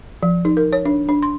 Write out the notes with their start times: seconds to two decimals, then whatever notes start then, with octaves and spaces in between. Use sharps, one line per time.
0.23 F3
0.45 D#4
0.57 A#4
0.73 C#5
0.85 D4
1.09 D4
1.23 C6